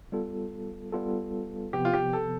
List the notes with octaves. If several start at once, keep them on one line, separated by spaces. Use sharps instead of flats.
G3 B3 F4 A4
G3 B3 F4 A4
C3 F3 B3 G4
F4
G4
A4